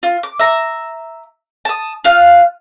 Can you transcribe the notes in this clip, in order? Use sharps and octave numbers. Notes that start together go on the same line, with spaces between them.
F4
D6
E5 A#5
A5 D#6
F4 F5 F#6